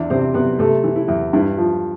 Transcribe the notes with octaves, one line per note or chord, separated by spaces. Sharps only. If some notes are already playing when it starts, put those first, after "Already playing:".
Already playing: E2 D4 D5
C3 C4 C5
C3 B3 B4
C3 A3 A4
E3
E4
E2
G2 E4
F3